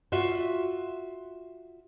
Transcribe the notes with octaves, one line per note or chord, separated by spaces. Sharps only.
F4 F#4 E5